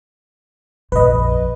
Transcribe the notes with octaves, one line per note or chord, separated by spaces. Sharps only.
A#1 F2 B4 D#5